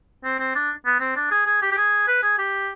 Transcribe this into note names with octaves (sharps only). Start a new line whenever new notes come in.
C4
C4
D4
B3
C4
D4
G#4
G#4
G4
G4
G#4
B4
G#4
G4